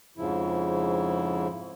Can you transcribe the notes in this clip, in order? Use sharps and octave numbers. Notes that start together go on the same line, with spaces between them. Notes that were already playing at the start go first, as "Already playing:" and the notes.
F2 G#2 C#3 F3 E4